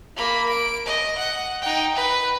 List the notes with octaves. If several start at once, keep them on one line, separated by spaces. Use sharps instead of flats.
A#3 B5
D7
D#5
F#5
D#4 G5
B4